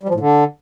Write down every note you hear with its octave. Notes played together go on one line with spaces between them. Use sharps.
G3
F3
A2
D3